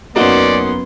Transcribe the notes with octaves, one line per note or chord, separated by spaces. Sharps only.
F#2 A#3 B3 C#4 D#4 F#4 D5 C6